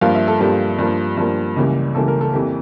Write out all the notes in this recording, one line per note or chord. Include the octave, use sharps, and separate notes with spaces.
G2 F3 A#3 F5
E5
A4
G2 F3 A#3 G4
G2 F3 A#3
G2 F3 A#3
C#2 C#3 E3 G3 A#3
C#2 C#3 E3 G3 A#3 A4
A#4
A4
F2 E3 A#3 G4